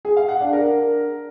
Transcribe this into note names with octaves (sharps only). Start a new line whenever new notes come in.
G#4
F5
F#5
D4
A#4